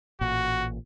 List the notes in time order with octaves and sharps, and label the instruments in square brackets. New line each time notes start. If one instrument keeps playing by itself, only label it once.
[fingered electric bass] A1 A#2 [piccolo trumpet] F#4